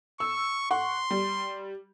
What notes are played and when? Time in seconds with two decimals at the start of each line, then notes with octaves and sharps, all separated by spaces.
0.20 C#6 E6
0.71 F#5 C6 C#6
1.10 G3